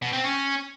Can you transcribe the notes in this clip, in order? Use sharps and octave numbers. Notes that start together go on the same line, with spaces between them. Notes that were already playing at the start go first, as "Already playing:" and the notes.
B2
C4
C#4